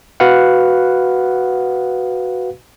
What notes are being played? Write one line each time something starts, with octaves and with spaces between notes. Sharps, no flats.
F#4 B4 F5 F#5